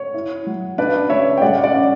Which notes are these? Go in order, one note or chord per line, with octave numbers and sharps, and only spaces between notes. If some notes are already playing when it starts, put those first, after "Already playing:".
Already playing: C#5
E4
F#3
D4 B4 D5
C#3 C#5 E5
G5
G3 D5 F#5
D5 F#5
C#4